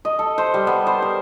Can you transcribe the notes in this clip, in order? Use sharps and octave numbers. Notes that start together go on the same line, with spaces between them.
D#5
A4
C5
G3
B3
C5
A#4